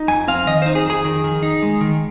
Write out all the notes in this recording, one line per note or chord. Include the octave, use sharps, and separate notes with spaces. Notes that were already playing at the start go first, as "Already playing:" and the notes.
Already playing: D#4
F2 G#5
C4 F5
D#3 D#5
D#4 C5
G#4
F2 G#4
D#3
D#3
D#4
G#3
D#3